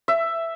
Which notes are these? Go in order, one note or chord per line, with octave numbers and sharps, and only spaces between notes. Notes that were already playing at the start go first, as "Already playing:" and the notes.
E5